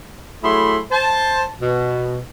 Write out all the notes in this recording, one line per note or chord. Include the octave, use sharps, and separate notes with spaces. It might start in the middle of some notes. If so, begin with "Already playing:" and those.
F#3 A3 E4 G#4 B5 C6
C5 A5
B2